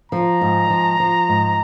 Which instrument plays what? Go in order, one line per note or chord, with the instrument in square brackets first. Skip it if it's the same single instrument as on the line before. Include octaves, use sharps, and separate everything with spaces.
[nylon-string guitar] F3 [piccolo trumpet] A#5
[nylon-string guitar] G#2
F3
F3
G#2